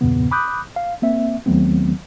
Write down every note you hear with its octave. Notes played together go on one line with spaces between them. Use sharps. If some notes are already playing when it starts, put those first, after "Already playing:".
E2 G2 A#2 C#3 B3
B5 D6 D#6 F#6 G6
F5
A#3 C4 E5
D#2 D#3 F#3 A3 B3 C4